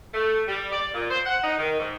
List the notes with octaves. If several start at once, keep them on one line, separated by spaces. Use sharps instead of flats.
A3
G3
D5
A#2
C5
F#5
D#4
D#3
G#2